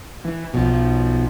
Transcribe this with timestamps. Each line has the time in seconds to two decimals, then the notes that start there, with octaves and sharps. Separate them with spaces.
0.25 E3
0.54 B1 B2 F3